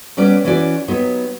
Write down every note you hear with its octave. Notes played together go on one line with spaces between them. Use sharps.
F#3 G3 B3 C#4 G4 D5
E3 C#4 E4 F#4 D5
F#3 B3 D#4 G4 C#5